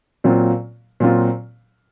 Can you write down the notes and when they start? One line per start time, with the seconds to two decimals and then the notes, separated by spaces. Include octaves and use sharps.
0.24 A#2 F#3 C4 F4
1.00 A#2 F#3 C4 F4